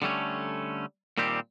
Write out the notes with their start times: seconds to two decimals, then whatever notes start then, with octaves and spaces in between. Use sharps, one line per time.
0.02 D3 G3 A3 C#4
1.18 A#2 D#3 G3 C4 G4